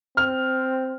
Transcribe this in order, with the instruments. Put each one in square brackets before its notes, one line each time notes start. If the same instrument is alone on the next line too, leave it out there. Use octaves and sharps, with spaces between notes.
[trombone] C4 [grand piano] F6